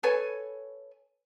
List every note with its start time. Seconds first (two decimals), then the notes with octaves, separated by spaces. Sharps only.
0.03 A4 B4 C#5 G#5